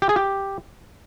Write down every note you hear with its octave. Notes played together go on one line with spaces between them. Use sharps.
G4
G#4
G4